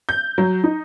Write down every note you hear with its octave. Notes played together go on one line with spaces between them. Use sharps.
G6
F#3
D#4